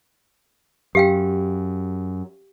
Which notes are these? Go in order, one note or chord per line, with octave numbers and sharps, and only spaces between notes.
F#2 G4 F5 G5